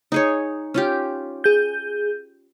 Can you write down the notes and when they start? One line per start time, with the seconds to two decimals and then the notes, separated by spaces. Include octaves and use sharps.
0.12 D#4 G#4 C#5
0.74 C#4 F4 G4
1.44 G#4 G6